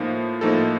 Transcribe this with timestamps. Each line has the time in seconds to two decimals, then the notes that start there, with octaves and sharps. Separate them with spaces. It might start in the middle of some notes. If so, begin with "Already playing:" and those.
Already playing: A2 F3 A#3 D#4
0.41 A2 F3 A#3 D#4 A4